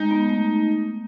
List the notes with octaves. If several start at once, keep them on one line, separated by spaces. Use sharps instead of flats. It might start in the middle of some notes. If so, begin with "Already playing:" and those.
Already playing: G#3 D#4
B3
A3
A3